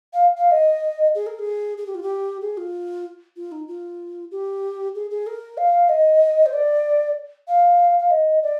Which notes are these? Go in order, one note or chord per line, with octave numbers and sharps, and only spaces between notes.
F5
F5
D#5
G#4
A#4
G#4
G#4
G4
F4
G4
G#4
F4
F4
D#4
F4
G4
G#4
G#4
A#4
F5
D#5
C5
D5
F5
F5
D#5
D5